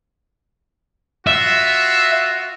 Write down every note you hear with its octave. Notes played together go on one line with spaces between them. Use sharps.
F4 F#4 E5